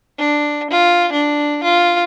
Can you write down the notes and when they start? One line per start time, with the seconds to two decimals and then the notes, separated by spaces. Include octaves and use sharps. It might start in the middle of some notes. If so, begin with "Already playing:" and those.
0.18 D4
0.71 F4
1.12 D4
1.64 F4